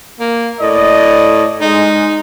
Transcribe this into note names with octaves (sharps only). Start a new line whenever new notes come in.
A#3
A2 D5 D#5
G#3 D#4